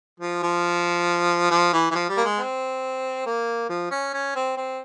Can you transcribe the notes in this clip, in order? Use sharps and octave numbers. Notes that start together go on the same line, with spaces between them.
F3
F3
F3
E3
E3
F3
G3
A#3
G#3
C4
A#3
F3
C#4
C#4
C4
C4